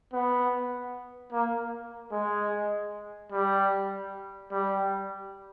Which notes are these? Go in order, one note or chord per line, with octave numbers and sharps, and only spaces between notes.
B3
A#3
G#3
G3
G3